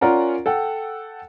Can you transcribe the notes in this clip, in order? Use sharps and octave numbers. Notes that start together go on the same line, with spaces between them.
C#4 F4 A#4 D5 F#5 A#5
A4 F#5 G5